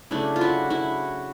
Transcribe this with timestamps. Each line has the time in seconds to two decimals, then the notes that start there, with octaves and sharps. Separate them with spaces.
0.11 C#3 F#3 A3 D4 E4
0.36 F4
0.41 E4 F#4
0.70 E4 F#4